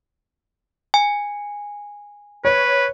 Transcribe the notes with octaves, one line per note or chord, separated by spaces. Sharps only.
G#5
B4 C#5